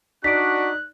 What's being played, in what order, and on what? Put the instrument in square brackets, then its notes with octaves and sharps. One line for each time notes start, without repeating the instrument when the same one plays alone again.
[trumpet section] D4 F#4 [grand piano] D#4 D5 [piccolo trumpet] F#6 [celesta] B6 D7